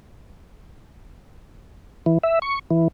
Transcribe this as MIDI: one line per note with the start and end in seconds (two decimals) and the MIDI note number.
2.06 2.18 52
2.23 2.39 76
2.42 2.59 85
2.71 2.88 52